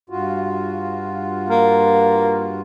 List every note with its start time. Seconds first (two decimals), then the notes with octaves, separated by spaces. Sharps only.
0.10 G2 F4 F#4
1.51 A#3